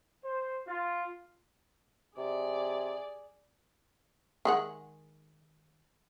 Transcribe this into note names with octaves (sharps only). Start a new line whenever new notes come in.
C5
F4
C3 G#4 D5
D#3 G#3 F#5